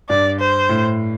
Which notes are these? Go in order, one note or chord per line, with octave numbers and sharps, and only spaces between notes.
G2 D5
C5
A2